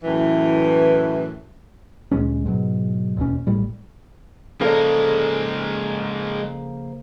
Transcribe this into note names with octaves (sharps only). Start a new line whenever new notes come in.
F#2 A2 E3
D2 A#2 G#3 C#4
G#2 B2 F#3
E1 D#2 B2 C#4
A1 A2 G3
C#3 F3 G#3 A#3 A4 A#4 D5